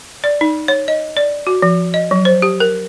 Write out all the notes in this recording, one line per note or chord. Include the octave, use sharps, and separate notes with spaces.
D5
D#4
C#5
D#5
D5
F#4
F3
D#5
F#3
C5
G4
A#4